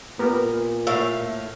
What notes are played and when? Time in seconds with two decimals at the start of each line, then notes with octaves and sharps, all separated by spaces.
0.19 A#2 B3 G4 A#4
0.87 A2 E5 F5